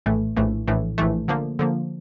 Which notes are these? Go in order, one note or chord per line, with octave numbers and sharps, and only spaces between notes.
A#1 A2 E3 A3
A#1 A2 E3 A3
A#1 A2 E3 A3
A#1 A2 E3 A3
D3 F3 A#3
D3 F3 A#3